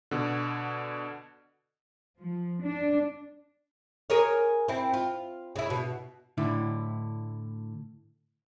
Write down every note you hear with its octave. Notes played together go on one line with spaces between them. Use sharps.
B2 D3
F3
D4
G#4 A#4 C#5
C4 E4
F4
C#3 E4
B2
A2 D3 E4